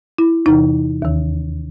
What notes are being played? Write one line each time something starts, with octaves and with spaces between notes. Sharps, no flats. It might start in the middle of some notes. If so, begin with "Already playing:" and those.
E4
E2 C3 E3 D#4
D#2 D#3